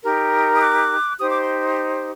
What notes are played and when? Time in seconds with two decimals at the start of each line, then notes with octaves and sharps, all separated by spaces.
0.03 D#4 G4 A#4
0.56 D#6
0.61 D6 F#6
1.19 D#4 G4 C5 D#6
1.30 D6
1.41 C6